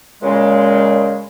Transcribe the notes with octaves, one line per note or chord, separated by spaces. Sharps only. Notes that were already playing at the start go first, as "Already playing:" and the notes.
A#2 C#3 G#3